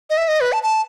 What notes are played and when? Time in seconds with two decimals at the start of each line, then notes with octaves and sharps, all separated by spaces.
0.10 D#5
0.17 E5
0.28 D#5
0.41 B4
0.52 A5
0.63 A5